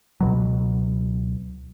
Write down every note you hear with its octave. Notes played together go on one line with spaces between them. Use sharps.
C#2 B2 F#3